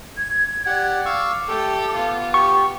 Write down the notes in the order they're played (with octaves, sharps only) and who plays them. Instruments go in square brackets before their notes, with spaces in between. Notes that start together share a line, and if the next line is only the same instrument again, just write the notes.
[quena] G#6
[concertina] G4 F#5 [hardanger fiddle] D5
[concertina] F5 C#6 E6 [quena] D6
[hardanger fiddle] A3 G4 [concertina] A4
[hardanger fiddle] B3 F4
[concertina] G4 [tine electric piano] C#6